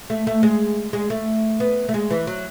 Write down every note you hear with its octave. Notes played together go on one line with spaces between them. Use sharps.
A3
A3
G#3
G#3
A3
B3
A3
G#3
E3
F#3